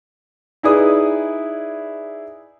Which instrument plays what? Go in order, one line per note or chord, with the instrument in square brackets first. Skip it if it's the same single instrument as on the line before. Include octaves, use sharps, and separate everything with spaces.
[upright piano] D#4 E4 G#4 B4 D5 D#6